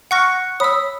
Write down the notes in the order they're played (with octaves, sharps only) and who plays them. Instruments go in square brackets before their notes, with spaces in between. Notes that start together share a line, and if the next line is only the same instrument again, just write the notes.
[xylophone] F#5 C#6 A#6 [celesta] F6 F#6 C#7
[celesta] C#5 B5 B6 [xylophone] D#6 E6